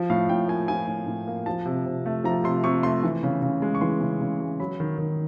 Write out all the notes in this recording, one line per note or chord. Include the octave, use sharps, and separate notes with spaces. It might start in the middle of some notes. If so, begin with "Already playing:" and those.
Already playing: F3
A2 F5
A2 G5
A#3 G#5
F3 G#5
A2
A2
A#3
F3 A5
C3
C3
A3
F3 A#5
C3 C6
C3 C#6
A3 C6
E3
C#3
C#3
G#3
C#6
E3 C6
C#3
C#3
G#3
F#3 B5
D#3
D#3